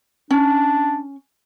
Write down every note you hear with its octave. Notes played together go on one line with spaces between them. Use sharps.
C#4 D4